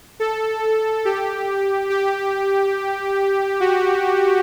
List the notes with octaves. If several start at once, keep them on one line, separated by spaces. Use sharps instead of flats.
A4
G4
G4
F#4